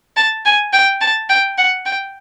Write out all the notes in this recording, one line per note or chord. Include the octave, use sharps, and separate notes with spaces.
A5
G#5
G5
A5
G5
F#5
G5